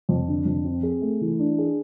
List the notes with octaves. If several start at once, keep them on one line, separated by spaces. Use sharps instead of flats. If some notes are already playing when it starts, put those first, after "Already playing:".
F2
D3
F2
C4
G#4
A3
E3
D4
G#4